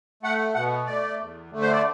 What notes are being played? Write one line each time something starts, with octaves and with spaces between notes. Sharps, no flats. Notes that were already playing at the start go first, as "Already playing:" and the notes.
A3 F#5
B2 F#5
A3 D5
E2
D3 A3
C5
D5